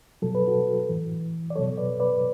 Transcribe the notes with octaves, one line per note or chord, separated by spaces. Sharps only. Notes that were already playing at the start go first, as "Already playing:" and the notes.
B2 F#3 A4
B4
F#4 A4
A2 E3
D5
B2 F#3 A4 C#5
B4 D5
B4 D5